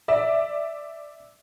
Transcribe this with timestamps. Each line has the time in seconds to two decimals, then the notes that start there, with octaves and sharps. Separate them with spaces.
0.08 D5 E5